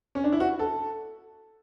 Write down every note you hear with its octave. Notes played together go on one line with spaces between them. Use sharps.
C#4
D4
E4
F#4
A4